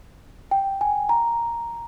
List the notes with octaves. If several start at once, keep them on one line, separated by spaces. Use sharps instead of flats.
G5
G#5
A#5